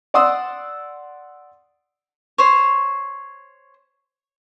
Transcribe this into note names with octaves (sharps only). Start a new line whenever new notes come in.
D5 F#5 C6 D#6 E6
C5 C#5